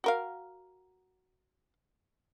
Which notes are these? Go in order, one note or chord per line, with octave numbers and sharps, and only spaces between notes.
F#4 A#4 F5